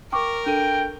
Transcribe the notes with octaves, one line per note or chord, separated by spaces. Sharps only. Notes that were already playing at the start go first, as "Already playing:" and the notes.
A#4 G5 C#6 D6
D4 A4 G5 D#7